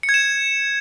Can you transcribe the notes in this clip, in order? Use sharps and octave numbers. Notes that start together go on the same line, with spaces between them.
C#7
G#6
E7